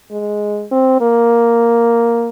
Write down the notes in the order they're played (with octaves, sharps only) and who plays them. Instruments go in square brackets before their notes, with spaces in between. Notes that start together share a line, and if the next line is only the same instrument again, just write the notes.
[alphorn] G#3
C4
A#3